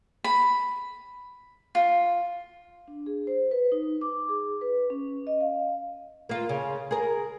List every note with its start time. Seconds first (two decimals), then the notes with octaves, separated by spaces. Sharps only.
0.24 B5
1.75 F4
2.88 D4
3.06 G#4
3.27 C5
3.51 B4
3.72 D#4
4.01 D6
4.29 G#4
4.61 B4
4.90 C#4
5.27 D#5
5.41 F5
6.29 A#3 F4
6.49 C#3
6.91 G#4 A#4